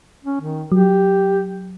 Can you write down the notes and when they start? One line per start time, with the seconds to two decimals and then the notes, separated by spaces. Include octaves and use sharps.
0.24 C#4
0.41 D#3
0.72 F#3 G4